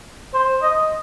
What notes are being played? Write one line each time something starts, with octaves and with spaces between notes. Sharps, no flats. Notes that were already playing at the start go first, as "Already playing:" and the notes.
C5
D#5